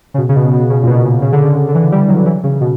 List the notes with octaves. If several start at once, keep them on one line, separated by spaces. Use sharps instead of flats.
C#3
B2
C#3
B2
B2
C#3
A#2
B2
C#3
C#3
D3
C#3
D3
E3
G3
F#3
E3
C#3
B2